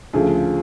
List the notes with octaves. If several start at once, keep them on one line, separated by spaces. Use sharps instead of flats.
D2 C#3 F3 G#4